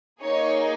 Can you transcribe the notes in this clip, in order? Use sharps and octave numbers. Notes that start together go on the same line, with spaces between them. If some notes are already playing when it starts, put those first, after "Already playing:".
A#3 D#4 G#4 C#5